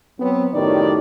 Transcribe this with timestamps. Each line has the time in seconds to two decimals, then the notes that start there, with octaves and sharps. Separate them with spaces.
0.19 F#3 B3 C4
0.53 F#2 A2 D#3 D#4 G4 D5